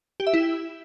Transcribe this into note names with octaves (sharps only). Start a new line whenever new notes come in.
G4
E5
E4